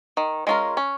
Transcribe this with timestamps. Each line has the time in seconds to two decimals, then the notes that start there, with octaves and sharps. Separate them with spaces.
0.17 D#3
0.47 G#3 C#4 F4 A#4
0.77 C#4